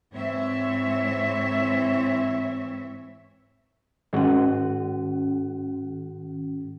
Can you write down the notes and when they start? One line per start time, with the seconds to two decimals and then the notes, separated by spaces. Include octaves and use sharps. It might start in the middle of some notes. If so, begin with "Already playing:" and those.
0.12 G#2 E3 C4 C#5 E5
4.13 G#2 D#3 G#3 C#4 F#4